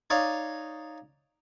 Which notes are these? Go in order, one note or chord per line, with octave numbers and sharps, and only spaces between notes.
D#4 C#5 D5 F5